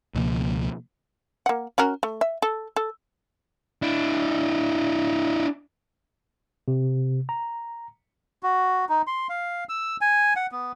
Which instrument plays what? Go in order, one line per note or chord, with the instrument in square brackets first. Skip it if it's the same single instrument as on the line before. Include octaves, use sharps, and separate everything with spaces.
[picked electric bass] C#2 B2 F3 A#3
[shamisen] A#3 F#5
C#4 F#4 A#4
A3
E5
A4
A4
[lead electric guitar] D4 E4
[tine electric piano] C3
A#5
[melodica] F#4
D#4
C6
F5
E6
G#5
F#5
B3